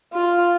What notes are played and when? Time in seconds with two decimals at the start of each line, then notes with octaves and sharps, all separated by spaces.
0.13 F4